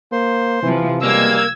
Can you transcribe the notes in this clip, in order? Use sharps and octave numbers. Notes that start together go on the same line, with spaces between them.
A#3 C5 C6
C3 E3 F3
B2 E3 G3 G#3 A#3 E6 G#6